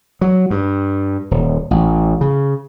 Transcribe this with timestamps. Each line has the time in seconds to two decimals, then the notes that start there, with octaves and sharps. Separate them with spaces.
0.21 F#3
0.50 G2
1.31 D#1
1.71 A1
2.21 C#3